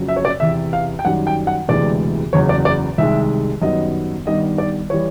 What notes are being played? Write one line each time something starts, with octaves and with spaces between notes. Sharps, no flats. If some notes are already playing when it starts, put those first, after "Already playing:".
Already playing: F#1 F2 C#3 F#3
E5
C#5
D5
E2 C3 E3 E5
F5
G5
F#2 D#3 G3 F#5
G5
F#5
E1 D2 C3 E3 G#3 D5
F#1 E2 C#3 F#3 C#5
D5
D5
C2 C3 D#3 G#3 E5
F#2 D#3 G3 B3 D#5
G2 D#3 G3 B3 D#5
D5
E3 G3 C#5